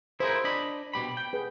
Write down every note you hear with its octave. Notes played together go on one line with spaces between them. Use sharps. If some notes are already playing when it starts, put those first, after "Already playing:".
E4 G#4 A#4 C5
D4 D#5 B5
B2 G4 B5
G5
G#4 B4